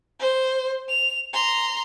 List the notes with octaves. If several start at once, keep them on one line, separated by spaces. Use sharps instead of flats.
C5
F7
A#5 C6